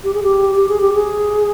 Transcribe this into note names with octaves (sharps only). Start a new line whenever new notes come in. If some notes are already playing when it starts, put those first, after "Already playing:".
G4
G#4
G4
G4
G#4
G4
G#4